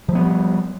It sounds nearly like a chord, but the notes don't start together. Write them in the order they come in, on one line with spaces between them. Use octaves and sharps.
F3 G#3 B3 G3